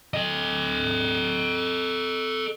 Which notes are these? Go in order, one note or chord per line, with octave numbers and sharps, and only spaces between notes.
A4 D#5